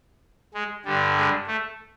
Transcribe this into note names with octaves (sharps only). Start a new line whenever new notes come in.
G#3
G2 D3 G3
G#3
A3